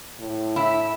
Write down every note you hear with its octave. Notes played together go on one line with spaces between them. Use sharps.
A2
E4 E5